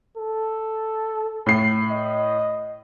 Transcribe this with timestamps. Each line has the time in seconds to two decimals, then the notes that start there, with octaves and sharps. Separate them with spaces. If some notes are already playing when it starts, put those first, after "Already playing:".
0.17 A4
1.46 A2 C7
1.91 D#5